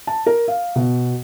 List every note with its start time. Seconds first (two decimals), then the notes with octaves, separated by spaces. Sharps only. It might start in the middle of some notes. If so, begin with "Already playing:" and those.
0.07 A5
0.26 A#4
0.48 F5
0.76 B2